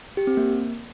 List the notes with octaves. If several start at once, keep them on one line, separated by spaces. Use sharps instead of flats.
G4
C4
A#3